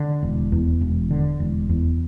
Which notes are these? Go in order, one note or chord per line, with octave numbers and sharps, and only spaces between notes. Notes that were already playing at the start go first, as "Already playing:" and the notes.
Already playing: D3
E1
E2
E1
D3
E1
E2